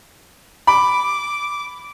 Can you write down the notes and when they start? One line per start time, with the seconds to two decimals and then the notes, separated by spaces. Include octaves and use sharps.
0.67 B5 D6